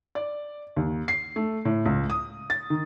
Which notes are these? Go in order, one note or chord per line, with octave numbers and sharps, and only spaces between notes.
D5
D#2
C7
A3
A2
C#2
D#6
A6
D#3